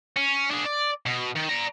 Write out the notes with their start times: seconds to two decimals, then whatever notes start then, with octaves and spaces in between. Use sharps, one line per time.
0.16 C#4
0.51 D4 G#4
0.66 D5
1.06 B2
1.36 D#3
1.49 D5 A#5